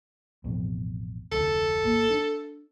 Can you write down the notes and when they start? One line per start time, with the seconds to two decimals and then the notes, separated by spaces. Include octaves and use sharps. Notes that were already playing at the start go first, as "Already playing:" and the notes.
0.44 A1 F2 B2
1.32 F1 D2 A4
1.84 G#1 A#3
2.10 D4